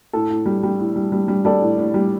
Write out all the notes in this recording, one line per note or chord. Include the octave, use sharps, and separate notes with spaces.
A2 A4
A2
G3
G3
A2
G3
G3
G3
G3 A4 D5
A2
A2
G3